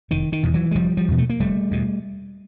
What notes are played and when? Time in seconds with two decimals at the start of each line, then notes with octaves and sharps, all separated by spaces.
0.11 F1 D#3
0.32 D#3
0.43 E2 B2
0.54 E3 F#3
0.71 G#3
0.75 F1 F3 G3
0.97 F3 G3
1.08 E2 B2
1.18 A3
1.30 A#3
1.40 F1 G3 A3
1.71 E2 B2